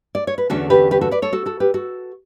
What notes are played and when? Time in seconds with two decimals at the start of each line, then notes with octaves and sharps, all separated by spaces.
0.15 D5
0.27 C#5
0.38 B4
0.50 E2 D3 A3 C#4 F#4 A4
0.70 G4 B4
0.91 G4 B4
1.01 F#4 A4
1.11 B4 D5
1.22 A4 C#5
1.33 F#4 A4
1.46 F#4 A4
1.60 G4 B4
1.74 F#4 A4